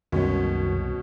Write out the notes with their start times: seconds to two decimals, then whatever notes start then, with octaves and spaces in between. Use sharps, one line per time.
0.12 C2 F#2 B2 D#3 G#3 C#4